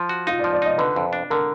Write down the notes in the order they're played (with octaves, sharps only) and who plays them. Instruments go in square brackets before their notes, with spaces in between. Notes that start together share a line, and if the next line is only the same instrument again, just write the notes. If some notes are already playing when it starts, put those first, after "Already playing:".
Already playing: [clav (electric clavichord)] F3
F#4
[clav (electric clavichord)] D#4 [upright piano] F4
[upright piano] D5
[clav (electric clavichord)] F3
[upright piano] D5
[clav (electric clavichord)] D#4 [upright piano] D#5
[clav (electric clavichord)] D3 [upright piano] B4
[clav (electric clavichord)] F2
D4
[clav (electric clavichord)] D3 [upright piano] A#4